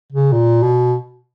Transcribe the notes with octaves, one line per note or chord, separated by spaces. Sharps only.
C#3
A#2
B2